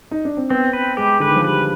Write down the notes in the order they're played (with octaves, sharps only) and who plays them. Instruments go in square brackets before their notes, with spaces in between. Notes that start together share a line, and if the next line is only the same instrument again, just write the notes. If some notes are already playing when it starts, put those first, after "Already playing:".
[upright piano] D#4
D4
C4
[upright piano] B3 [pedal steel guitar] C4
[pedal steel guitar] B4
[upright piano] G#3 [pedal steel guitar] G4
[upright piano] D3 [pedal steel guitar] B4
[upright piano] D#3
F3
[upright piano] G3 [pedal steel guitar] B4